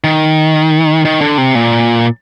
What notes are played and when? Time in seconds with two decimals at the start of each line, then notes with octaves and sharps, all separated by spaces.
0.04 D#3
1.05 D#3
1.21 D3
1.38 C3
1.55 A#2